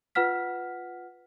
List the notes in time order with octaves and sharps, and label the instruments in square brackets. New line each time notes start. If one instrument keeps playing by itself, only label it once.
[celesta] F4 B4 F#5 F6 B6